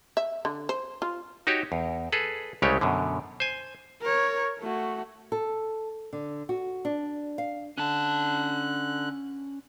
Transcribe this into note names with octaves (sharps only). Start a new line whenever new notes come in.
E5
D3
C5
F4
D#4 F#4 G4 C#5
E2
G#4 A4 B4
C2 C#3 G#3 A3 G4 C#5
F#2 B2 D3
C5 G#5
A#4 C#5
A3 F#4
A4
D3
F#4
D4
F5
D3 C#4 A5 F#6